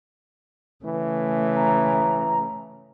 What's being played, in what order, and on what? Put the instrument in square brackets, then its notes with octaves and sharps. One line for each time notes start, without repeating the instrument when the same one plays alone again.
[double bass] C#3 A3 [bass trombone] E3
[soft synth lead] A#5